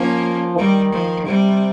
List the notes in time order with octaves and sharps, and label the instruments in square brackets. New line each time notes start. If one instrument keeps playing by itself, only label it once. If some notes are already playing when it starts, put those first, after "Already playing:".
Already playing: [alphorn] F3 [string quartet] A#3 C#4
[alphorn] D#3 [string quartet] G3
[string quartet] F3
[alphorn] C3 [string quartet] G3